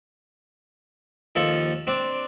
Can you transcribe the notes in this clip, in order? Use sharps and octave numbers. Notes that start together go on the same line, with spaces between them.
D#2 F3 A4
C4 D4